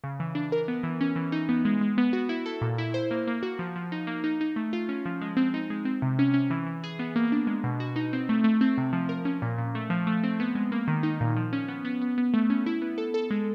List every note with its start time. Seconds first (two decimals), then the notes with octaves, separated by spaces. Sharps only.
0.04 C#3
0.20 E3
0.35 D4
0.52 A#4
0.68 B3
0.83 E3
1.01 C#4
1.16 E3
1.32 D#4
1.49 B3
1.65 G#3
1.81 G#3
1.98 B3
2.13 F#4
2.29 E4
2.46 A4
2.61 A#2
2.78 E4
2.94 C5
3.11 A#3
3.27 A#3
3.43 F#4
3.59 F3
3.76 F3
3.92 D#4
4.07 A#3
4.24 D#4
4.41 D#4
4.56 A3
4.73 F4
4.89 C#4
5.06 F3
5.21 G#3
5.37 C4
5.54 D#4
5.70 G#3
5.85 C4
6.02 C3
6.19 C#4
6.34 C#4
6.50 E3
6.67 E3
6.84 G#4
6.99 B3
7.16 A#3
7.32 D4
7.47 G#3
7.64 B2
7.80 F#4
7.96 D#4
8.13 C4
8.29 A3
8.44 A3
8.61 C4
8.78 C3
8.93 F3
9.09 A#4
9.25 C#4
9.42 A#2
9.58 A#2
9.75 A3
9.90 F3
10.07 A3
10.24 C4
10.40 B3
10.55 G#3
10.72 A#3
10.88 D#3
11.03 D#4
11.21 A#2
11.37 F3
11.53 C#4
11.68 B3
11.85 B3
12.01 B3
12.18 B3
12.34 A3
12.50 C#4
12.66 E4
12.82 B3
12.98 A4
13.14 A4
13.31 G#3